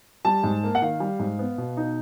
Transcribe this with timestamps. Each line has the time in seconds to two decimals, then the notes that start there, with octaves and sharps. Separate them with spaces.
0.25 G3 A5
0.43 G#2
0.63 A#3
0.75 F#5
0.82 D#3 F5
1.00 G3
1.19 G#2
1.39 B3
1.58 B2
1.77 D#4